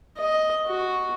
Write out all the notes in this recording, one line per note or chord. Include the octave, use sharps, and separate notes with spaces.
D#5
F#4